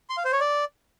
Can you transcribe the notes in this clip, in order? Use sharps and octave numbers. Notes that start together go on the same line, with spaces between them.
C6
F5
C5
C#5
D5